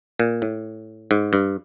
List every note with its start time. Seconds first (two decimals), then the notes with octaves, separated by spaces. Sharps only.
0.19 A#2
0.42 A2
1.11 G#2
1.33 G2